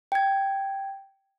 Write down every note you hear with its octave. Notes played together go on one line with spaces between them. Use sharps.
G5 G#6